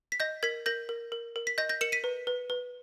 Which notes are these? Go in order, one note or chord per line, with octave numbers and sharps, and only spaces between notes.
B6
D#5 G6 A#6
A#4 G#6 B6
A#4 G6 A#6
A#4
A#4
A#4
B6
D#5 G6 A#6
G6 A#6
A#4 C#7 E7
B6 D#7
B4
B4
B4